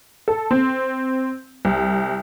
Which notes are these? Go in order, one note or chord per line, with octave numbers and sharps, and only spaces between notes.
A4
C4
C2